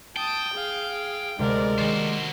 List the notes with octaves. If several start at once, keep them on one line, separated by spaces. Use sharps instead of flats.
G5 A5 D#6
G#4 F5
D2 C3 G#3 A#3 A#4 D5
D#3 F#4 C5 A6 C#7